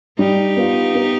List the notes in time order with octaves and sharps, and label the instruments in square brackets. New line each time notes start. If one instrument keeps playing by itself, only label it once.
[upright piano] G3 [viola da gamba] D#4 G4
[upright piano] B3 F4
B3